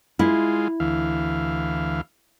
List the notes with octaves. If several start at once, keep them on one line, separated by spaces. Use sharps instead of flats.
G#3 E4 F4
D2 E3 F5